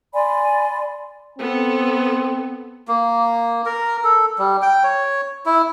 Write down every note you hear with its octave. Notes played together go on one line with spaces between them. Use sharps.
D5 G#5 B5 C6
B3 C4 A4
A#3
A#4
A4
G3
G5
C#5
E4